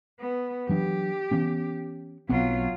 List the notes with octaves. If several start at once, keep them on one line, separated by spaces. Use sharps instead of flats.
B3
E3 F#3 D4 G4
E3 B3 C#4
B1 F#3 B3 C4 F4